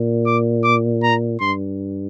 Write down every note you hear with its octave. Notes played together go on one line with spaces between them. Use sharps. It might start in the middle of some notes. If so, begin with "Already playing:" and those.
Already playing: A#2
D6
D6
A#5
G2 C6